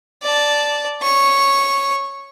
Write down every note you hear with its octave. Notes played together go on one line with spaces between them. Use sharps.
D5 A5
C#5 C#6